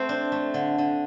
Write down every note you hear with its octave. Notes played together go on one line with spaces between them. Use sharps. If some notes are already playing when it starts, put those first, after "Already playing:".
Already playing: A3 C4 C5
D4
A3
D3
D3